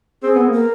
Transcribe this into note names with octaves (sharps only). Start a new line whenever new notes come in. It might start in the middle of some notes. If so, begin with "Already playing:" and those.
C4 G#4
B3
A#3
A#4